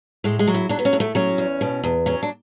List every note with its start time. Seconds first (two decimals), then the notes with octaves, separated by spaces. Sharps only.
0.24 A2 G#3
0.39 G#3
0.47 F#3
0.54 E4
0.69 F#3 D4
0.79 B3
0.85 C#4
0.93 A2
1.00 A3
1.15 F#3 C#4
1.38 E2
1.61 B2
1.84 E2
2.06 F#3 C#4
2.23 D4